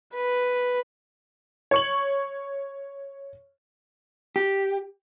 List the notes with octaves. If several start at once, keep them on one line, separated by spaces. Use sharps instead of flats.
B4
C#5 C#6 F#7
G4